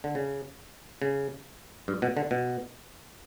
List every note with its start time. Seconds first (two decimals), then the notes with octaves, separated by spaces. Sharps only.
0.04 D3
0.15 C#3
1.02 C#3
1.88 G2
2.02 B2
2.17 D3
2.31 B2